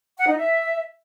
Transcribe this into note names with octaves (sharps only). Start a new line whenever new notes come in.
F#5
D#4
E5